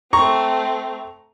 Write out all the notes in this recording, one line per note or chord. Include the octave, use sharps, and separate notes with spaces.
A3 C4 A#5 C#6